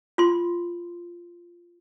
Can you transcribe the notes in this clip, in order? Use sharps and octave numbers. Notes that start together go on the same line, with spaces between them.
F4 C6